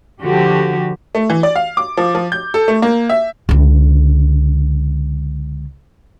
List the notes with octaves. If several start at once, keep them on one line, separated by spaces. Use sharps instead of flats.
D3 F3 F#4 G4
A3
E3
D5
F5
D6
F3
F3
G6
A4
A3
A#3
E5
C#2 D3